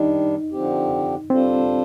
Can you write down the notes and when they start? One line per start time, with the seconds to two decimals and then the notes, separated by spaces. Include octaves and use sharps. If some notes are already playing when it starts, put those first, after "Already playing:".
Already playing: D#3 G3 D4 D#4
0.52 D3 F3 C4 G4
1.30 G3 C4 D4 F4 A4 C5